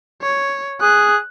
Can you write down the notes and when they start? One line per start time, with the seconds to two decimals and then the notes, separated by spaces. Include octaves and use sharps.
0.23 C#5
0.81 G#4 F#6